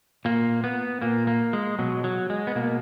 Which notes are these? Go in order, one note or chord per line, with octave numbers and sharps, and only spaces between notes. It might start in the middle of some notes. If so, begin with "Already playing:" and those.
A#2 A#3
B3
A#2 A#3
A#3
G#3
B2 F#3
F#3
G#3
B3
B2 A#3